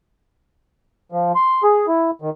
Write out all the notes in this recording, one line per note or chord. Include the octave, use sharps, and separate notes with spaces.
F3
C6
G#4
E4
D#3